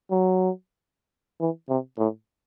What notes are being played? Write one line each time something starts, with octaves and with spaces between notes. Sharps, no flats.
F#3
E3
C3
A2